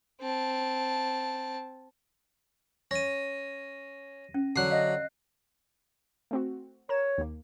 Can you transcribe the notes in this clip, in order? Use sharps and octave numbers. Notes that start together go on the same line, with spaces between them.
C4 A5
C#4 A#6 D#7
C#4
D3 F#3 F#6 C7
D#5 F5
A3 C4 F#4
A#4 C#5 E7
D#2 A#3